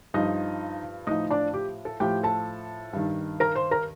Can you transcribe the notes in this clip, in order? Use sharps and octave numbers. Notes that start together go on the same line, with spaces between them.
G2 F3 D#4 D#5
A2 F3 D#4 D#5
D4 D5
G4
A4
A2 F3 G4 G5
A4 A5
G2 D#3
A#4 A#5
C5 C6
A#4 A#5